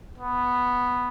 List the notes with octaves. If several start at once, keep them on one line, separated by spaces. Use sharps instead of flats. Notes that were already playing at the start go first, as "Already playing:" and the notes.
B3